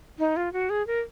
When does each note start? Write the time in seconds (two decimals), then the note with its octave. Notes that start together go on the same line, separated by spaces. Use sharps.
0.19 D#4
0.36 F4
0.53 F#4
0.70 G#4
0.87 A#4